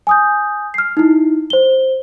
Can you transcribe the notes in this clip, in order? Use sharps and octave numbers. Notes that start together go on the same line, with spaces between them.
G#5 D#6 G6
F6 C7
D#4 E4
C5 G7